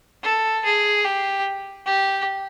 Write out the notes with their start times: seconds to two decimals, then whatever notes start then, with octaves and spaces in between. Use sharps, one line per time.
0.23 A4
0.65 G#4
1.05 G4
1.86 G4